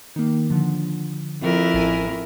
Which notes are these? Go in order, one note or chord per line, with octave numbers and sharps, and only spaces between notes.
D#3 A#3
D3 F3
F2 E4 A#4
A1 G#5 D#7